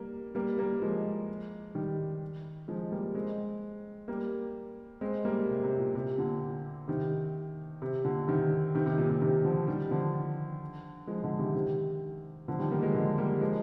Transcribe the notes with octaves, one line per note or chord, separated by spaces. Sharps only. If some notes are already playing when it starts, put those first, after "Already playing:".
Already playing: G3 A#3
G3 A#3
G3 A#3
F3 G#3
D#3 G3
F3 G#3
G3 A#3
G#3 C4
G3 A#3
G#3 C4
G3 A#3
C3
C3
A#2
C3
A#2 D3
C3 D#3
C3
A#2 D3
C3 D#3
C3 D#3
C3
A#2
C3
C3 D#3
D3 F3
D#3 G3
D3 F3
F3 G#3
D3 F3
C3 D#3
C3 D#3
D3 F3
D#3 G3
G3 A#3
F3 G#3
D3 F3
G3 A#3
F3 G#3